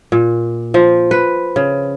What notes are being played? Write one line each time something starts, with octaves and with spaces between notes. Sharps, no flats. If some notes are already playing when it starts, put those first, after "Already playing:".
A#2
F3
B4
C#3